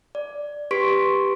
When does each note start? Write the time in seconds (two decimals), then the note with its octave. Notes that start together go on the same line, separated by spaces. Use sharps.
0.15 D5
0.71 G4 B4 C6 C#6 B6 D7